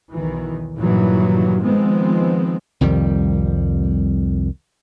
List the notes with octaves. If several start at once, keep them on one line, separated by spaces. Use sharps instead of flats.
B1 E2 D#3 E3
G2 A#2 D#3 E3 F#3
D#3 F3 G#3 B3 C4
C2 F2 D#3 G3